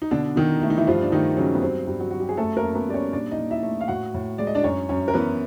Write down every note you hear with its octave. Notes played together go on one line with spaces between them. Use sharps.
D#4
B2 D3 D4
B2 D#3 D#4
A3 E4
D#4
E3 E4
G2 F3 F4
D4
D#3 A3 D#4
C#3 F#3 C#4
B3
G2 C4
G2
F#3 F#4
F#3 F#4
G4
G#4
F#2 A3 A4
A#3 A#4
F#2
B3 B4
G3 D5
C#4 C#5
A#2 D4 D5
D#4 D#5
A#2
E4 E5
A3
F5
A2 F#4 F#5
A2
G#3 D5
D#5
D4 D5
F#2 C#4 C#5
F#2 C#4 C#5
A#4
E3 B3 B4